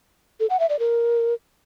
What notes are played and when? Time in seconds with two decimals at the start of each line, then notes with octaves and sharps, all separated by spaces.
0.40 A4
0.50 F#5
0.60 E5
0.69 D5
0.79 A#4